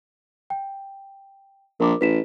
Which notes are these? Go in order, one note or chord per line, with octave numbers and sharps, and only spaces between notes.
G5
A#1 A#4 D6
A1 B4 B6 E7